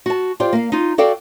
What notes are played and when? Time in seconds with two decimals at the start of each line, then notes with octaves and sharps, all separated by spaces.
0.06 F#4 A5
0.40 F4 G4 C5 D5
0.53 A#3 F5
0.72 D#4 F4
0.98 F#4 A4 D5 F5 G5